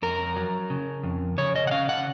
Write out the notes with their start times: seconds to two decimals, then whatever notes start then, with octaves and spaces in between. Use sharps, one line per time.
0.02 F2 A#4
0.36 F#3
0.70 C#3
1.04 F2
1.38 C#3 C#5
1.56 D#5
1.67 F#5
1.71 C#4 F5
1.89 F#5